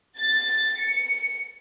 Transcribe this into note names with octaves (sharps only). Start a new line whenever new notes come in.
A6
C#7